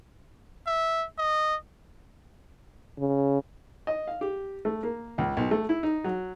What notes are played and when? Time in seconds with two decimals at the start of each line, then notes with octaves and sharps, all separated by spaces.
0.67 E5
1.18 D#5
2.99 C#3
3.87 D#5
4.08 F5
4.21 G4
4.65 A3
4.83 A#3
5.18 C#2
5.37 B1
5.51 A3
5.69 E4
5.83 D#4
6.04 F#3